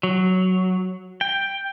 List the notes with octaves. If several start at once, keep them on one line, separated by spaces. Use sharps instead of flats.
F#3
G5